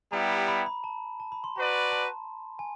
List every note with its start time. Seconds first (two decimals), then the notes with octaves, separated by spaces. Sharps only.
0.11 G3 B3 E4 G4 A#5
0.30 A#5
0.48 B5
0.66 B5
0.84 A5
1.20 A5
1.32 B5
1.44 C6
1.56 F#4 B4 D5 A#5
1.92 A5
2.59 G#5